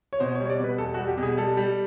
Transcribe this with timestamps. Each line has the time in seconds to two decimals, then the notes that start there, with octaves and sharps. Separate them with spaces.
0.13 C#5
0.20 B2 C5
0.35 C#5
0.41 G3
0.46 C#5
0.50 D5
0.60 B2 B4
0.78 E2 A4
0.94 F#4
0.98 G3
1.08 G4
1.18 B2
1.23 G#4
1.37 G3 A4
1.57 G3